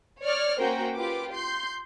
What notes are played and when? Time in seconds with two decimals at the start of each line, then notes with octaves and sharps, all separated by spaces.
0.22 C#5 D5 F6
0.59 A#3 C#4 F#4 A#4 C5 G5
0.94 F4 G4 B4 D6
1.32 C6 G6